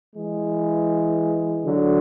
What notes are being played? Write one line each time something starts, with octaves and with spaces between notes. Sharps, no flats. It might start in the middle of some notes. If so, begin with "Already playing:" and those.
E3 G#3
D3 F#3